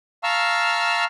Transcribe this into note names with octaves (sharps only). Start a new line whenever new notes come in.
F5 A5 A#5 C#6 E6 F6